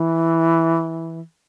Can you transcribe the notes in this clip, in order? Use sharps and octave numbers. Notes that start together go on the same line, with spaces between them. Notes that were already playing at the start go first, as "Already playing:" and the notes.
Already playing: E3